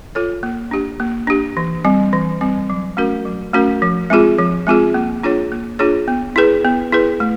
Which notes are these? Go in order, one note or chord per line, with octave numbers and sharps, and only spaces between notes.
F4 A4 C#5
A#3
D4 G4
A#3
D4 G4
E3
G3 C4
E3
G3 C4
F#3
A3 C#4 F#4 A#4
F#3
A3 C#4 F#4 A#4
F3
G#3 C4 F4 G#4
F3
G#3 C4 F4 G#4
A#3
D4 F4 G#4 C#5
A#3
D4 F4 G#4 C#5
B3
E4 G#4 B4
B3
E4 G#4 B4
A3